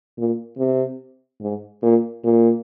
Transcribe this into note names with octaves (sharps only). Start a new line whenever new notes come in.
A#2
C3
G#2
A#2
A#2